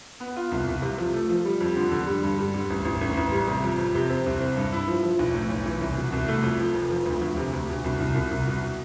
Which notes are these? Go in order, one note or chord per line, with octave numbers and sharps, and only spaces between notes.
B3
F4
C2
C2
C3
F3
A3
F3
G3
F2
D3
D3
G3
G2
G3
D3
A1
A1
A1
A1
G3
C3
F2
F2
C3
C4
C2
C4
G2
E4
F3
F3
B1
A2
B1
E3
C2
B2
C2
A3
F2
F3
F1
F3
D2
D2
C3
D2
B2
C2
C2
C2
C2
B2